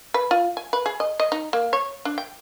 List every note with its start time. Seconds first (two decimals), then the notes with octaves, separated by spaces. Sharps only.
0.14 B4
0.31 F4
0.57 G#5
0.73 B4
0.86 G#4
1.00 D#5
1.20 D#5
1.32 D#4
1.53 A#3
1.73 C#5
2.05 D4
2.18 G5